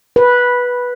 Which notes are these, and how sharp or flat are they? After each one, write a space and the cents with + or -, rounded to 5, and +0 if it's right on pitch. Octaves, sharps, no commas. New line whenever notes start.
B4 -10